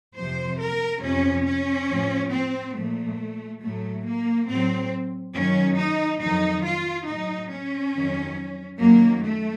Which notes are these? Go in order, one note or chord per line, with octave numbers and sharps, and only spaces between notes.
F2 C3 F3 C5
A#4
F2 C3 F3 C#4
C#4
A2 F3
C4
A#2 F3 A3
A2 F#3 A3
A#3
A2 F#3 C4
F#2 D#3 F#3 C#4
D#4
F2 D#3 F#3 D#4
F4
A2 F#3 D#4
C#4
F2 D#3 F#3
F#2 D#3 F#3 A#3
A3